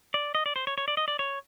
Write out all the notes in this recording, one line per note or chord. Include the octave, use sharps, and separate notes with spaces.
D5
D#5
D5
C5
C#5
C#5
D5
D#5
D5
C#5